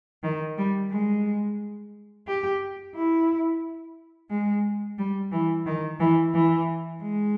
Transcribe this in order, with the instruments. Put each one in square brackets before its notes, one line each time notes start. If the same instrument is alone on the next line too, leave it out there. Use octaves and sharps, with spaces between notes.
[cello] D#3
G3
G#3
G4
E4
G#3
G3
E3
D#3
E3
E3
G#3